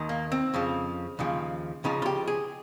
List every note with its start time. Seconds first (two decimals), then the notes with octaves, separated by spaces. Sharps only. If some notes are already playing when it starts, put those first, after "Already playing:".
Already playing: D#2 D#3
0.09 A#3
0.32 C4
0.54 F2 C#3 F3
1.19 D#2 C#3 F3
1.84 C#2 C#3 F3 D#4
2.02 F4
2.06 G4
2.27 G#4